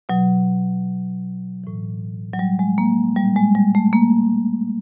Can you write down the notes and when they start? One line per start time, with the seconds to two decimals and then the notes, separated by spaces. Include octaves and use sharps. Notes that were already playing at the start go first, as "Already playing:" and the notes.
0.09 B2 F#3
1.64 A2 E3
2.34 F#3
2.39 G3
2.59 G#3
2.78 A#3
3.16 A#2 F3 G3
3.36 G#3
3.55 G3
3.75 A3
3.93 A#3